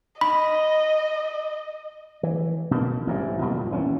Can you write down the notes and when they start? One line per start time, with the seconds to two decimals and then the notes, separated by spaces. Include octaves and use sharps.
0.21 D#5 B5
2.23 E3
2.71 B2 A#3
3.07 A1 G#2 B2 G3
3.41 F2 B2 G3 A#3
3.57 A#2
3.70 F#1 D#2 E3 C#4